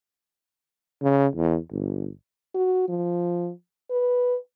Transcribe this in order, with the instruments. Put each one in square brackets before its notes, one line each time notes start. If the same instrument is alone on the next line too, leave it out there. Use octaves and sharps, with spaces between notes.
[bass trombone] C#3
E2
G1
[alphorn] F#4
F3
B4